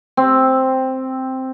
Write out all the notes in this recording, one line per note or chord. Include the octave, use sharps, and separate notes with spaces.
C4